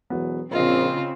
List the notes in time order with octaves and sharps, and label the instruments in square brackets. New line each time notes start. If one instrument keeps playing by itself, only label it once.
[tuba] E1 [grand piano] E3 F#3 B3
[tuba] A#1 [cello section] C#3 C4 [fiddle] F4 [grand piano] C5 D#5